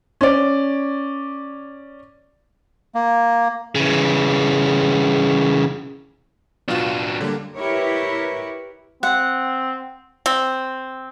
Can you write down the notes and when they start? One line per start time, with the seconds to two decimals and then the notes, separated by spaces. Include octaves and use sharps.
0.21 C#4 D5
2.95 A#3
3.76 C#3 E3
6.68 B2 F#3 D4 F4
7.21 D3 G3 A#3
7.58 E4 G4 A#4 B4 C#5
9.03 C4 F#5
10.26 C4